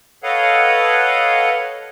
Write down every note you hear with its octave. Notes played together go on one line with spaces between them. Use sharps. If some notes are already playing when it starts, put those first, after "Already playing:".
A4 B4 C#5 D#5 F5 F#5